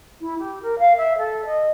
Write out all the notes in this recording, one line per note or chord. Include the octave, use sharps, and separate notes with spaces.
E4
G4
A#4
F5
E5
A4
D#5